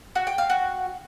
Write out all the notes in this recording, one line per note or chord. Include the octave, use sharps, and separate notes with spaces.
F#4
G5
F5
F#4